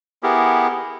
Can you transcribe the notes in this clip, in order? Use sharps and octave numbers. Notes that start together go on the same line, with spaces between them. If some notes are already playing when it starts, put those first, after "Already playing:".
B3 E4 G4 G#4 A#4